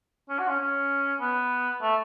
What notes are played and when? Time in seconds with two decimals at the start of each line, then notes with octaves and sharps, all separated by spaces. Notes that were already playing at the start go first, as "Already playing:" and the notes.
0.29 C#4
0.39 F#4
0.48 C#4
0.60 C#4
1.20 B3
1.81 A3